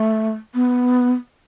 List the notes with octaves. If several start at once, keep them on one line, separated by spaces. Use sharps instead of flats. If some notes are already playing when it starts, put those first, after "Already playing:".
Already playing: A3
B3